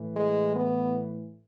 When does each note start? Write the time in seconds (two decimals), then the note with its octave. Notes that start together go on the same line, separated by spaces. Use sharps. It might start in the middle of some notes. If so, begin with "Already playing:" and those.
Already playing: A2 E3
0.17 G#3
0.56 B3